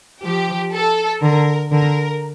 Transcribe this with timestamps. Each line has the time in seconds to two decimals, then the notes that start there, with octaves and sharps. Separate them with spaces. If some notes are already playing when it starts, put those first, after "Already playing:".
0.23 F3 G4
0.72 A4
1.22 D3 A#4
1.71 D3 A#4